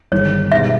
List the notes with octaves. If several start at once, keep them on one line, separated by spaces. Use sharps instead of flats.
G1 G2 D#3 G#3 C#5
B2 G#3 B3 D#4 G4 E5